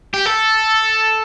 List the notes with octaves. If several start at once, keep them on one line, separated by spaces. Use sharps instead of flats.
G4
A4